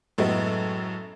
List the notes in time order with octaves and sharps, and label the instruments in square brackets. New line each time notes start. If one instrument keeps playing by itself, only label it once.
[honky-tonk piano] F#2 A2 G#3 A3 B3